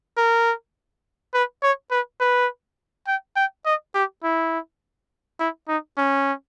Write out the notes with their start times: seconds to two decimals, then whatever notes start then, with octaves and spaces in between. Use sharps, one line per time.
0.18 A#4
1.34 B4
1.63 C#5
1.91 B4
2.21 B4
3.07 G5
3.36 G5
3.66 D#5
3.95 G4
4.24 E4
5.40 E4
5.68 D#4
5.98 C#4